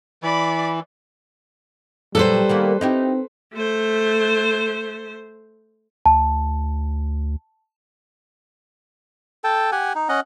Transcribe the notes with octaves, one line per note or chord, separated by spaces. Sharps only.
E3 D5 B5
A#2 F#3 G3 G4 A4 B4 C5
D#3 A#3 B3
C4 D#4 E4 G4
A3 C5
D2 A5
A4 G5 A5
G4 F#5 G#5
D#4
C#4 D#5 F#5